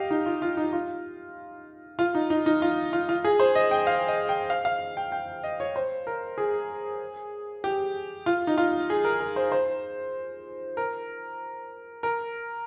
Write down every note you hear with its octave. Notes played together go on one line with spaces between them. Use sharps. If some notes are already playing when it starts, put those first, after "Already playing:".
Already playing: G4 D#5 F5
D#4
F4
F4
D#4
F4
F4
D#4
D#4
D#4
F4
F4
F4
G#4
C5
D#5
G5
F5
D#5
G5
F5
F5
G5
G5
D#5
C#5
C5
A#4
G#4
G4
F4
D#4
F4
G#4
A#4
A#4
C5
C5
A#4
A#4